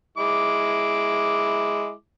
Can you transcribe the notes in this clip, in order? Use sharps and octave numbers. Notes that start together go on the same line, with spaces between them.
G#3 E4 D6